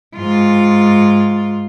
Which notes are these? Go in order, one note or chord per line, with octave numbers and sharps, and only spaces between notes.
G#2 F4